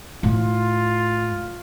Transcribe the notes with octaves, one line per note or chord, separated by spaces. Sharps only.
A2 F4